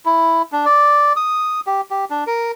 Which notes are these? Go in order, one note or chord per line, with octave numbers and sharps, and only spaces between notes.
E4
D4
D5
D#6
G4
G4
D4
A#4